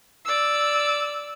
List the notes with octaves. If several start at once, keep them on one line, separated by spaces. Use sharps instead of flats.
D5 E6